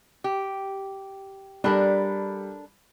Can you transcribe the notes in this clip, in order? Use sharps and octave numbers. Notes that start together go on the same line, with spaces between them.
G4
G3 D4 A4 A#4 B5